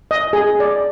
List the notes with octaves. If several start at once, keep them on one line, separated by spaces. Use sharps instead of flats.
D#5
G#4
D5